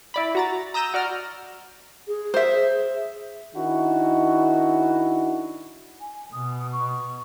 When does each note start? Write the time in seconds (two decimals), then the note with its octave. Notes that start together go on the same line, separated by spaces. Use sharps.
0.14 E4 D5 B5
0.35 F#4 A#5 A6
0.74 A#5 D#6 E6 G6 A#6 E7
0.94 F#4 D5 A#5 F6
2.08 G#4
2.34 C5 E5
3.55 D#3 D4 E4 F#4
6.01 G#5
6.33 B2 D#6
6.73 C#6